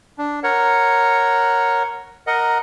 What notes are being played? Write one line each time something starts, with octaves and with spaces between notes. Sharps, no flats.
D4
A#4 C#5 F#5
A#4 D#5 F#5